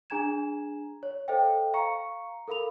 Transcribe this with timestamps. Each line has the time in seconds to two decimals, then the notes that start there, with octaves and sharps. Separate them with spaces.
0.10 D4 G#4 G#5 A#5 G#6 E7
1.03 C#5
1.28 A4 C5 D#5 F5 G5
1.74 F5 A#5 C#6 C#7
2.48 A4 A#4 F5 B5 F7